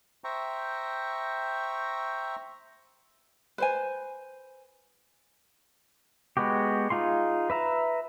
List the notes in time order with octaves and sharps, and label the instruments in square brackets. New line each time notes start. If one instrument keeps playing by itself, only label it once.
[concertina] C5 E5 G5 A#5 C#6
[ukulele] B4 C5 G#5
[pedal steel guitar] G#3 B3 F#4 G4
D#4 F4 G#4 C6
B4 E5 A#5